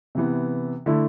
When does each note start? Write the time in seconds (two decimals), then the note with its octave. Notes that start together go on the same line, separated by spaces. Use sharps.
0.15 C3 E3 B3
0.86 D3 A3 E4